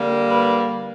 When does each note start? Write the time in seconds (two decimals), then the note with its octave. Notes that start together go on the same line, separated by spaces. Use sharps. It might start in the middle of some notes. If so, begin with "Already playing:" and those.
Already playing: D3 G3 A#3
0.29 B4